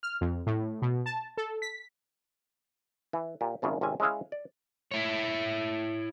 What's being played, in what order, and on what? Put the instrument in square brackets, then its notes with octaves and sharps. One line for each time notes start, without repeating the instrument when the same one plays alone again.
[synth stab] F6
F2
A2
B2
A5
A4
B6
[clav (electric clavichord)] E3
A#2 G4
G#1 F#2 C#3 F3
G#1 C3 C#4 E5 G#5
G#3 C#4 E4 G#4 F5
D5
[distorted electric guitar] E4 C#5